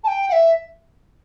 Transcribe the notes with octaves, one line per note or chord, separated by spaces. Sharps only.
A5
G5
F#5
E5